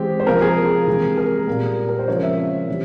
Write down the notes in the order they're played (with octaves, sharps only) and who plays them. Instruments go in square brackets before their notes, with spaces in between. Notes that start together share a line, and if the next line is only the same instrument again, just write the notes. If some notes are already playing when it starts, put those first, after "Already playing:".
Already playing: [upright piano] E3 G#3 C4 G4
C5
C3 F3 A#3 A#4
G#4
C3 E3 G#3
A#4
A#2 G3 A#3
A#4
C5
C#3 F3 G#3 C4 C#5
E5
E3 G3 C4